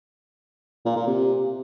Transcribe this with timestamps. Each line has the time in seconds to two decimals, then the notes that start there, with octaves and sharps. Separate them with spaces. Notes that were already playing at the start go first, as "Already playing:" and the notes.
0.85 A#2
0.96 A#2
1.07 C3